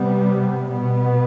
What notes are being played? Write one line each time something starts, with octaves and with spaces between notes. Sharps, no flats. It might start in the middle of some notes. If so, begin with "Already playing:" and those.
Already playing: C3 G3 B3
B2 B3